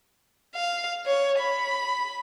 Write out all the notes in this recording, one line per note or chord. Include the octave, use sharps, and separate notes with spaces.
F5
C#5
B5